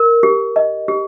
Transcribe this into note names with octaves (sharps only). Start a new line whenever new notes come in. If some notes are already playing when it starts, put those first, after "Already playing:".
Already playing: A#4
G4
D#5
G4